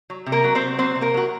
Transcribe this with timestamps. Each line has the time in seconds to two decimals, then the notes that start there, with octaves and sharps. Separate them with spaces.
0.10 F#3
0.26 C3
0.32 A#3 A#4
0.44 F#3
0.55 C4 C5
0.62 C3
0.78 F#3 C4 C5
0.96 C3
1.01 A#3 A#4
1.14 F#3 F#4